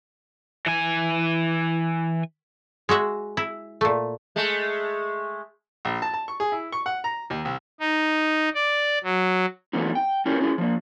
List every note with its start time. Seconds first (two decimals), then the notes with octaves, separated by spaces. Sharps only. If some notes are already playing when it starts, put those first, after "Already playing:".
0.66 E3 G#5
2.89 G#3 F#4 E5 F#5
3.37 E4
3.81 A#2 A3
4.36 G#3 A3
5.85 A#1
6.02 A5
6.14 A5
6.28 C#6
6.40 G#4
6.52 E4
6.72 C#6
6.86 F#5
7.04 A#5
7.30 D#2
7.45 C2
7.80 D#4
8.54 D5
9.04 F#3
9.73 E3 F#3 A3 B3 D#4
9.95 G5
10.26 C#4 E4 F4 G4 A#4 C#5
10.41 C#4 E4 G#4
10.58 F3 A#3